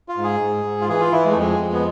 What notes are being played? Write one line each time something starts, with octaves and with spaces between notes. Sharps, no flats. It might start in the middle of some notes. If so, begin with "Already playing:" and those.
F4
G#2
G#4
G#2
G#2
F4
E3 G#4
F4
E3 E4
G#3
A3
F2 G#3
F2
B3